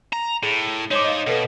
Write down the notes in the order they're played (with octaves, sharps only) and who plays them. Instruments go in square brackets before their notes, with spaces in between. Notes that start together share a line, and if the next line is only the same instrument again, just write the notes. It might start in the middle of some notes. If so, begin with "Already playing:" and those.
[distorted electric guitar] A#5
[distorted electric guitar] A2 [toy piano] G#4
[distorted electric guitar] D#4 C5 [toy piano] C#5 D6
[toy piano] D#5 F5
[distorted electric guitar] B2 [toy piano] A4 B4